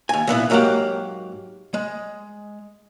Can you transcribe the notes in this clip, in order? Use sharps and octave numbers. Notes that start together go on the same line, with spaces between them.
D#2 G#5
A#2 E3 B3 E4
G#2 F#3 A#3 D#4 G4 F#5
G#3